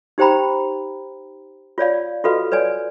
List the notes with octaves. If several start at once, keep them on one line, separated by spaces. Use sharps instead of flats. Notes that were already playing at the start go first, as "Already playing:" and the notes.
D#4 G4 C5 G5 A#5 B5
F4 C#5 D5 F5
F4 F#4 A4 B4 D#5 F5
B4 C#5 D5 G#5